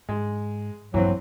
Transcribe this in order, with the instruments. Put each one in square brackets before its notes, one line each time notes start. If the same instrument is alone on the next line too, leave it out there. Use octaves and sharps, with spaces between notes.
[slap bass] G#2 [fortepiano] G#3
[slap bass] A#1 G2 A#3 [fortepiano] E3 C4 [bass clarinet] F#3